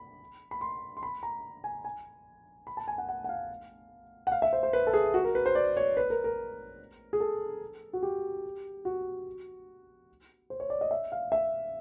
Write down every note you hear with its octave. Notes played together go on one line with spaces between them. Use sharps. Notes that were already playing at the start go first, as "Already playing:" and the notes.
Already playing: B5
B5
C6
C6
B5
A#5
G#5
G#5
B5
A5
G#5
F#5
F#5
F#5
F5
F#5
F5
E5
C5
C5
B4
A4
G#4
F#4
A#4
B4
C5
D5
C#5
B4
A#4
A#4
G#4
A4
F#4
G4
F#4
C5
C#5
D5
D#5
E5
F5
E5